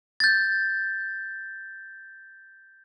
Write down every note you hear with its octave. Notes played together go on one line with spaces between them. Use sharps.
G6 A6